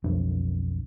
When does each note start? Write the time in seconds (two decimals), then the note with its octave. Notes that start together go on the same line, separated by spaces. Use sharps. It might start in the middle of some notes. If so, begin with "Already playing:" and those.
0.04 B1 F2 D4